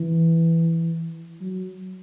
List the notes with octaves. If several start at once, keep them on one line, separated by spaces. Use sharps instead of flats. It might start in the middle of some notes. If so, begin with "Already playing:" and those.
Already playing: E3
F#3